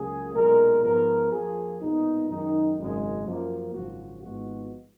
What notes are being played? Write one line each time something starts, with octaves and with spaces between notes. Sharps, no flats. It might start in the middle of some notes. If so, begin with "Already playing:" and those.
Already playing: C#2 C#3 F#3 A#3 G#4
B1 A#2 G#3 A#4
G#2 F3 G#3 B3 A#4
F2 F3 A#3 G#4
B1 A#2 G#3 B3 D#4
F#2 D#3 G#3 D#4
G#1 F#2 C#3 G#3
F#2 F3 A#3
G#1 F#2 C#3 F3 F#4
G#1 G#2 F3 G#3 B3 F#4